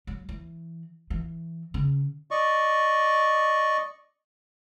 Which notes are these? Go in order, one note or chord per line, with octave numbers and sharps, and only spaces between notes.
F#3
E3
E3
C#3
D5 D#5 C#6